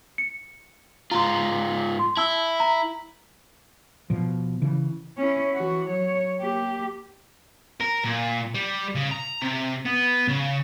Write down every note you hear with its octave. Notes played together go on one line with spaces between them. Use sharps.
C#7
G#2 F4 A#5 C6
C6
E4 A5 E6 G7
A#5
B2 F3
C#3 E3
C#4 E4
E3 F#4
F#3 C#5
A#3 G4
A#4
A#2
G3
C#3
A#5
C3
B3
C#3